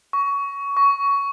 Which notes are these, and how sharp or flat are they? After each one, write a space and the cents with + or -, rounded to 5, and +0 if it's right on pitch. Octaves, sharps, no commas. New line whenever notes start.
C#6 +20
C#6 +15